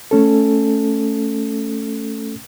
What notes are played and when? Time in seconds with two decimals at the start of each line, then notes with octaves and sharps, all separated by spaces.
0.11 A3 C#4 A4